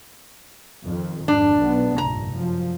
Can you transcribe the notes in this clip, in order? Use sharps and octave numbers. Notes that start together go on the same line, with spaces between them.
F2 D#3
G#1 F2 D4
B1 B3
F1 A#1 G2 A#5
F#2 F3